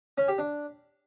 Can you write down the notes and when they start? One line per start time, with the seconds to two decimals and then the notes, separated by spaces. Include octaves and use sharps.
0.18 C#4
0.28 G4
0.38 D4